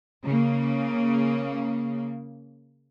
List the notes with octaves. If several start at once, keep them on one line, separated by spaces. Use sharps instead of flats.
C#3 A#3